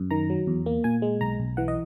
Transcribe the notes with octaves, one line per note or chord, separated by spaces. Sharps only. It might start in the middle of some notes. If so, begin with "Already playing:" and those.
Already playing: F#2
D#3 A#5
F#3
E2
A#3
A#2 G#5
G#3
B1 A#5
B1
E3 F#5
D#5